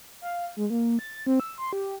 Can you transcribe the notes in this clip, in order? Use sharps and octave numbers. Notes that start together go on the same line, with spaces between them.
F5
G#3
A#3
A6
C4
E6
C6
G4